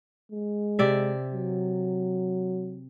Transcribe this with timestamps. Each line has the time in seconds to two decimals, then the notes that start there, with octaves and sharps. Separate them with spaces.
0.32 G#3
0.79 C3 D5 E5
1.34 F#3